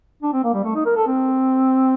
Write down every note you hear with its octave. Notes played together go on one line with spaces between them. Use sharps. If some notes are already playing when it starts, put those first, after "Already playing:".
D4
C4
A#3
G3
A3
D#4
A#4
A4
C4